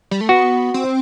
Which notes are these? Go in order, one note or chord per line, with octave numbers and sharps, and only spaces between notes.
G3
A3
B3 F#4
C4